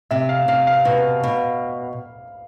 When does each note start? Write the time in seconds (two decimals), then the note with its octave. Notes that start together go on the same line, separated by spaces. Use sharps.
0.11 C3 E5
0.29 F5
0.48 C3 F5
0.67 F5
0.85 B2
1.23 B2